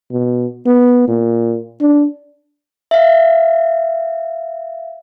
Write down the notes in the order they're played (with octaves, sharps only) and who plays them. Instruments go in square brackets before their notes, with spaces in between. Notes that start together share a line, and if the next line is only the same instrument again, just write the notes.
[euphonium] B2
B3
A#2
D4
[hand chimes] E5 F5